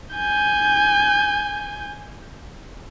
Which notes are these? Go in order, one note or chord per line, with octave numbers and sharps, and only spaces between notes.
G#5 G6